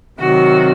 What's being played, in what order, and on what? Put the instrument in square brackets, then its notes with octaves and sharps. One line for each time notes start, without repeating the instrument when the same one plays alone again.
[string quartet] C3 D#3 F#3 F#4